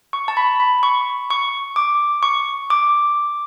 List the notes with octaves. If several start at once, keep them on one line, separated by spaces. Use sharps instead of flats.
C#6
A5
B5
B5
C#6
C#6
D6
C#6
D6